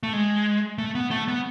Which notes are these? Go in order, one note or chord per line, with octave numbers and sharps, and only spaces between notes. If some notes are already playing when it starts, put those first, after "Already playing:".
A3
G#3
A3
B3
A3
B3